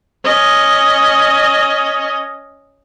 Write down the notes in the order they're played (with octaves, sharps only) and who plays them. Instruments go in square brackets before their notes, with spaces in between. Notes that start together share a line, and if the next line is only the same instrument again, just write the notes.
[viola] C#4 D#5